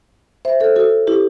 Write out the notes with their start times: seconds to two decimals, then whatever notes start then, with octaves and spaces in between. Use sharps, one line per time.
0.45 C5 E5
0.60 A4 C5
0.76 F#4 A4
1.07 E4 G4